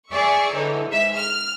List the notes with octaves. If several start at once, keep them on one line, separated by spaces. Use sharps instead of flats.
G#4 D5 E5 C#6
D3 E3 D#4 C#5
G#2 E5
F6